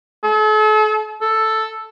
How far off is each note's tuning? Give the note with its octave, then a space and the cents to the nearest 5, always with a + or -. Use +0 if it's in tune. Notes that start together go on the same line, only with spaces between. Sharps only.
A4 -40
A4 +0